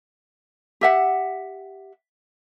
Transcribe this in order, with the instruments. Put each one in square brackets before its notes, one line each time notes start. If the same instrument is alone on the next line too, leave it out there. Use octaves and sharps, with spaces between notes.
[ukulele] G4 E5 F#5